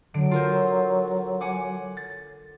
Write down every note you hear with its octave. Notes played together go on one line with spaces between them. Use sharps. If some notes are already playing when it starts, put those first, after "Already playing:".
D3 F#3 D7
F4 A#4 C5
F#5 G#5 D6
A6